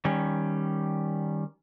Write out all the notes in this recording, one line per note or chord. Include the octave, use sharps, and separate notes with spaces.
D#3 G3 C#4